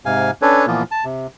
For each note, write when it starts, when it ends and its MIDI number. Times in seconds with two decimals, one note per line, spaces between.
0.06 0.31 44
0.06 0.31 48
0.06 0.31 77
0.06 0.31 80
0.42 0.66 61
0.42 0.66 62
0.42 0.66 69
0.42 0.66 71
0.42 0.66 73
0.67 0.83 46
0.67 0.83 52
0.67 0.83 53
0.67 0.83 58
0.67 0.83 59
0.67 0.83 65
0.91 1.04 81
1.05 1.27 48